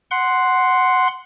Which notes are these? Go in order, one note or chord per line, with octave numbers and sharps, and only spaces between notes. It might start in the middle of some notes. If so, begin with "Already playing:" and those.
F#5 C6